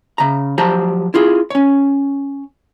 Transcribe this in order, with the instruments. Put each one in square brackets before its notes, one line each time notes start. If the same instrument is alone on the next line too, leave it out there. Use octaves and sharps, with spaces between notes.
[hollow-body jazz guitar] C#3 A#5
F3 F#3 G4 C5 A5 A#5
E4 F4 G#4
C#4 C#5